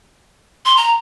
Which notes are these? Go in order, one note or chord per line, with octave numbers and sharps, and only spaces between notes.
C6
A#5